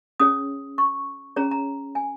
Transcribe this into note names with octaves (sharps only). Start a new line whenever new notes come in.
C#4 G#4 C#5 D#6
C#6
C#4 G#4 C#5 A#5
A#5
G#5